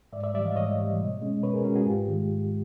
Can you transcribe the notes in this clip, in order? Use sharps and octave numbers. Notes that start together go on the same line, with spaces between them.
G#2 D5 E5
D5 E5
E3 G3 D5 E5
D#5 F5
G#2 C#5 D#5
E3 G3
B2
G#3 C#4
B2 B4 C#5
G#4 A#4
G#3 C#4 F#4 G#4
F#4 G#4
G#2 F4 G4
D#3 G#3
G#2